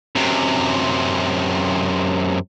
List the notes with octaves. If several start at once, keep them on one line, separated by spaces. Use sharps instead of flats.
F#2 C3